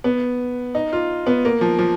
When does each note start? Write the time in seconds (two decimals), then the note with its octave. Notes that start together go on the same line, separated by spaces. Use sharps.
0.04 B3
0.75 D#4
0.93 F4
1.27 B3
1.45 A#3
1.61 F3
1.79 F3